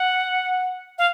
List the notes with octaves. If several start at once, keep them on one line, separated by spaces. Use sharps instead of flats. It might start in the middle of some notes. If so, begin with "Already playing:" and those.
Already playing: F#5
F5